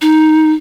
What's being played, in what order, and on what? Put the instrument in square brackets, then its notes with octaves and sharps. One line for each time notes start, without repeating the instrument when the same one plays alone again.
[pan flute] D#4